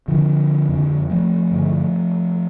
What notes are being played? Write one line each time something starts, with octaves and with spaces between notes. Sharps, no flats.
D3 F3
F2 D3
F3 A3
G2 D3